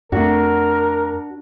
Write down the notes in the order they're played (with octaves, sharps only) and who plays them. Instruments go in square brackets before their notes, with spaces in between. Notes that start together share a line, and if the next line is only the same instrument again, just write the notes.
[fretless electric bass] F2 A3 [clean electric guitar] D4 F#4 [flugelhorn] A#4